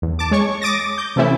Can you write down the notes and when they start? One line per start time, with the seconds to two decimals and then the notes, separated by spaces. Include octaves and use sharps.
0.02 E2
0.19 A5 D6
0.31 G#3 C#5 C#6
0.62 D6 D#6 A6 A#6
0.98 G6
1.16 C3 E3 A3 C4 C#4 E4